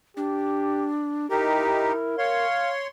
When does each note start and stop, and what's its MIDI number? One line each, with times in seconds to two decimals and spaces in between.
0.17 1.29 62
0.17 0.89 67
1.30 1.92 63
1.30 2.14 64
1.30 1.92 67
1.30 2.45 70
2.18 2.87 73
2.18 2.73 77
2.18 2.87 84